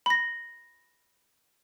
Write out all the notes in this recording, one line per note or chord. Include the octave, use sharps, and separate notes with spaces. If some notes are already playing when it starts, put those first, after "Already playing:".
B5 A#6